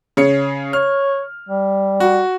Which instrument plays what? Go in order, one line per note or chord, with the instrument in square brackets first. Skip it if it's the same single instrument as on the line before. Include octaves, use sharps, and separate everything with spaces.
[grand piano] C#3 C#5 C#7
[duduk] C#5 [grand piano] F6
[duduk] G3
[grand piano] F#4